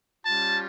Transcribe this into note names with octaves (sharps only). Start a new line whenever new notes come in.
G3 C#4 F4 A5